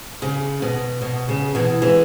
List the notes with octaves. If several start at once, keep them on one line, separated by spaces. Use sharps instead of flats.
C#3
B2
B2
C#3
B2 E3
E3 G#3